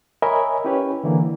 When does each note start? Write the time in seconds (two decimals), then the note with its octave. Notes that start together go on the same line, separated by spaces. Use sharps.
0.22 A#4 C#5 D#5 E5 G#5 B5
0.65 C#4 E4 G4 B4 C#5
1.04 D3 E3 A#3